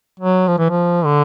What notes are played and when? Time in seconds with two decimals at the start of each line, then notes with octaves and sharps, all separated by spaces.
0.20 F#3
0.48 F3
0.58 E3
0.70 F3
1.05 D3